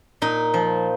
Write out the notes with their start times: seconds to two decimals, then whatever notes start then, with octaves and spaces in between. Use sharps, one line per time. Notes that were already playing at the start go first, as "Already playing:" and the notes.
0.22 A#2 D#4
0.54 F3